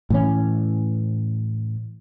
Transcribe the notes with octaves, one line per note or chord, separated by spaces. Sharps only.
A2 E3 C#4